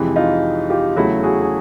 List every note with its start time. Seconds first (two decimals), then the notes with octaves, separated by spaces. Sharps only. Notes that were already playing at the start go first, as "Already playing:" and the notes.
Already playing: F2 C3 E3 G#3
0.16 D#4 F4
0.70 F4 G4
0.97 E2 C#3 F#3 A3 E4 F#4
1.23 F#4 G#4
1.42 G#4